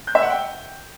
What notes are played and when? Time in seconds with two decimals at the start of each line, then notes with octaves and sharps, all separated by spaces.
0.07 G6
0.15 E5
0.23 F#5
0.30 G5